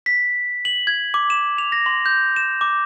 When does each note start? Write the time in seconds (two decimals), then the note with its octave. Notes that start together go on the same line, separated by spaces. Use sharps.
0.06 B6
0.65 F#7
0.87 G#6
1.14 D6
1.30 E7
1.58 F7
1.72 A#6
1.86 C6
2.06 G6
2.36 E7
2.61 D6